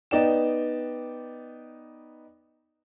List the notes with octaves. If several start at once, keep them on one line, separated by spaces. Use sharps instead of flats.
B3 D#4 D5 G5 E7